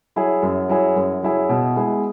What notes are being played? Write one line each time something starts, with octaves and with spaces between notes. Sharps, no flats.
F#3 E4 G#4
F#2
F#3 E4 G#4
F#2
F#3 E4 G#4
B2
G#3 B3 E4 G#4